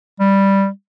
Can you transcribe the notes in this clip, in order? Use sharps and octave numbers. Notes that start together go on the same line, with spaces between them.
G3